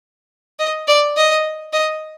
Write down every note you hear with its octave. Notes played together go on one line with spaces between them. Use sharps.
D#5
D5
D#5
D#5